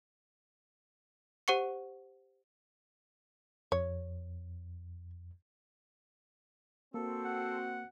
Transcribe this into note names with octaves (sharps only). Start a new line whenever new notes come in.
G4 C5 F#5 C#6 C#7
F2 C#5
A#3 C4 F#4 A4
F#5